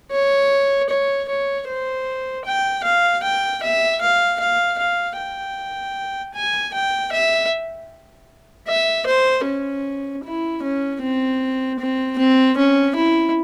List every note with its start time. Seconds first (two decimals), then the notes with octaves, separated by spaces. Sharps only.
0.12 C#5
0.89 C#5
1.29 C#5
1.68 C5
2.46 G5
2.84 F5
3.23 G5
3.62 E5
4.01 F5
4.40 F5
4.78 F5
5.17 G5
6.34 G#5
6.74 G5
7.12 E5
8.68 E5
9.07 C5
9.45 C#4
10.24 E4
10.63 C#4
11.02 C4
11.79 C4
12.18 C4
12.57 C#4
12.96 E4